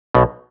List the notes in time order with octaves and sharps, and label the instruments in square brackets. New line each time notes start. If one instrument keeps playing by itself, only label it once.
[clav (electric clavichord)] B1 B2